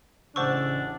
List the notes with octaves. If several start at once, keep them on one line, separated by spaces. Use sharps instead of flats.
A1 C#3 D4 C5 F#5 C#6 E6